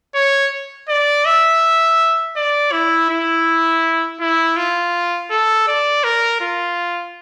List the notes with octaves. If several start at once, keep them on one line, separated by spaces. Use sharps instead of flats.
C#5
D5
E5
D5
E4
E4
E4
F4
A4
D5
A#4
F4